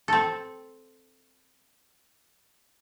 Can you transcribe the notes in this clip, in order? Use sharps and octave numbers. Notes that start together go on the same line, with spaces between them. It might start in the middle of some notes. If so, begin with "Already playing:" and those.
C4 A4